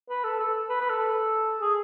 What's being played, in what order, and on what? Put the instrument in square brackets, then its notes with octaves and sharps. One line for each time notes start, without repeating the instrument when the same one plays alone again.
[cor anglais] B4
A4
A4
B4
B4
A4
G#4